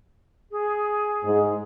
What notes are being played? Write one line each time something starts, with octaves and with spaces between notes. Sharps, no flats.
G#4
G#2